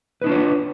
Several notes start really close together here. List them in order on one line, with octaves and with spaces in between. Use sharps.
B4 D#4 D4 F4 C#5